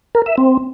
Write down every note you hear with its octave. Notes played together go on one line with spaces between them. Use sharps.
A#4
E5
C4